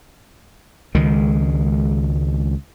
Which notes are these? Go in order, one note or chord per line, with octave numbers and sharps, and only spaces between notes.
C#2 D#3 G#3